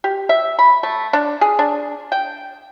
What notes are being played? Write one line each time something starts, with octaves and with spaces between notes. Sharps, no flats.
G4
E5
B5
A3
D4
G#4
D4
G5